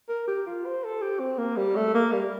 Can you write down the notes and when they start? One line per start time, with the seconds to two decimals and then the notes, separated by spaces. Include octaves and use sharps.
0.09 A#4
0.28 G4
0.46 F4
0.65 C5
0.84 A4
1.01 G4
1.20 C4
1.38 A#3
1.57 G3
1.76 A3
1.94 A#3
2.13 G3